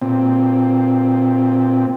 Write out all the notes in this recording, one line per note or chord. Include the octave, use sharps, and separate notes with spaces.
A#2 C4